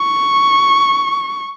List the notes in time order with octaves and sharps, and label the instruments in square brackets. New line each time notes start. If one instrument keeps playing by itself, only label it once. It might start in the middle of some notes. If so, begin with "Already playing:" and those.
Already playing: [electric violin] C#6